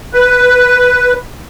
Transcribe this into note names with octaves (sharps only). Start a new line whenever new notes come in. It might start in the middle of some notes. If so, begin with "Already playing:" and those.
B4